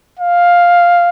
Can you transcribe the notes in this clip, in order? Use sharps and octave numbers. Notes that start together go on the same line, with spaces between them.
F5